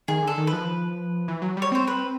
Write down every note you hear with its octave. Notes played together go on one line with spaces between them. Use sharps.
D#3 G#4
D3 A4
D#3
B4
F3
E3
F#3
G3 C#5
C4 C5
B4